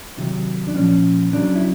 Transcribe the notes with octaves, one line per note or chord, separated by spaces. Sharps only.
C3 D#3 F#3
D4
A#2 F3 C#4
C#3 F#3 D4
E4